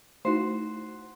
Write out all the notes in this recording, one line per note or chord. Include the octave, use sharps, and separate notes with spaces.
A3 D#4 E4 F#4 C5